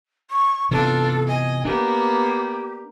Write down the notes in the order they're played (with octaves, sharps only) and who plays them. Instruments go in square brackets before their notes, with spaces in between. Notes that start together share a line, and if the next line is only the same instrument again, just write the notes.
[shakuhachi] C#6
[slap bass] C3 E3 B3 [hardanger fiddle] D4 F4 [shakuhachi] A4
[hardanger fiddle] D#5 [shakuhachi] G#5
[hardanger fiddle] A#3 B3 [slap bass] D4 [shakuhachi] G4